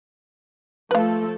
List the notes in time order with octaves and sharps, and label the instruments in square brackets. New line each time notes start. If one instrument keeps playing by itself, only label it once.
[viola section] F3 A3 A4 [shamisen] B4 F5